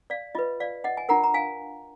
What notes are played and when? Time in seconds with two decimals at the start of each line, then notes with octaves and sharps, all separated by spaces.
0.10 D5 F5
0.35 F4 B4 D#5
0.60 D5 F5
0.84 D#5 F#5
0.97 G#5
1.09 D4 F4 A#4 F#5 A#5
1.24 A#5
1.34 F5 G#5